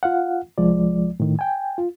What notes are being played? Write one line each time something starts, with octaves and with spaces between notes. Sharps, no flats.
F4 F5 F#5
C2 F3 G#3 D5
A2 D#3
G5 G#5
F4